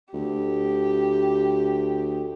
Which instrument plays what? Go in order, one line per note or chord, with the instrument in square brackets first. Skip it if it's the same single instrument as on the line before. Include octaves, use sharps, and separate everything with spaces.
[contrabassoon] D2 [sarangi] G4